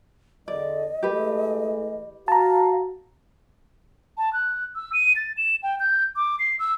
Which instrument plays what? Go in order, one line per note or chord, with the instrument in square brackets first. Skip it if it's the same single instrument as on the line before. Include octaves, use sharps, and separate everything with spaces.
[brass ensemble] E2 D3 [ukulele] D5 [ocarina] D#5
[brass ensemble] E3 G#3 A3 [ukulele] G4 B4
[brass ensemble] F#4 [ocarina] F5 [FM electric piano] A5 A#5
[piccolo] A5
F#6
E6
D#7
A6
E7
G5
G6
D6
C7
E6